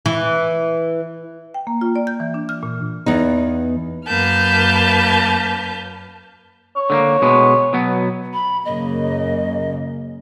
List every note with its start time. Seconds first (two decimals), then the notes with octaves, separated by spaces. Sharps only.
0.06 E3
1.54 G5
1.67 A#3
1.81 F4
1.96 D5
2.07 G6
2.20 E3
2.34 D4
2.49 F6
2.63 A#2
3.06 E2 B3 D#4
4.07 F#2 A#3 B4 A5 F6 G6
6.76 C#5
6.90 D3 A3 A#3
7.22 B2 G#3 B3
7.73 B2 F#3 B3
8.33 B5
8.65 F#2 C#3 A#3 D#5